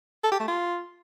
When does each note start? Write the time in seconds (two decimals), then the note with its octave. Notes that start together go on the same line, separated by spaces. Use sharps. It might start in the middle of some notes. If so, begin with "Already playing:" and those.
0.24 A4
0.32 G4
0.40 A3
0.48 F4